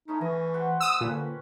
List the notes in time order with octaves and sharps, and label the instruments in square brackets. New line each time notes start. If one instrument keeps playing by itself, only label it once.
[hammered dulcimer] A3 C#4 E4 [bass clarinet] D#4
[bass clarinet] E3 [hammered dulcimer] D#5
[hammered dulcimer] G4 C5 F#5
[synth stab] D#6 E6
[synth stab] A#2 [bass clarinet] D3 [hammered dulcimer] C#4 B4